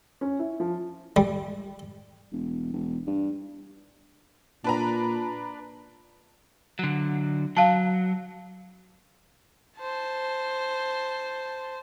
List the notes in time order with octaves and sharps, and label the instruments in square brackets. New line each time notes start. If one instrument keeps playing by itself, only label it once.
[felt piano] C#4
E4
F3
[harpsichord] G3
[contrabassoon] E1
E1
G2
[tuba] A#2 [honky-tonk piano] D4 B4 A#5
[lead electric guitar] D3 F#3
[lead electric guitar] F#3 [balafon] F5 A5
[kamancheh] C5 A5